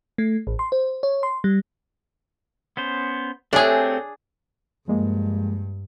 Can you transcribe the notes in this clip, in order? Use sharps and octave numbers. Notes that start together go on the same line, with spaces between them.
A3
A1
C6
C5
C#5
C6
G3
B3 C#4 C5
A3 C4 D4 G4 G#4 C#5 G#5
G2 F3 G#3 A#3